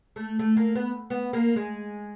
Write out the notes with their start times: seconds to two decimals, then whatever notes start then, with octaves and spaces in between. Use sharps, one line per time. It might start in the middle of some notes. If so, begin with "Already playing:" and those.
0.16 A3
0.39 A3
0.57 A#3
0.75 B3
1.10 B3
1.33 A#3
1.56 G#3